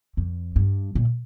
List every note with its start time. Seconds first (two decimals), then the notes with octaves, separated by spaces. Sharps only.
0.17 F2
0.56 G2
0.95 A#2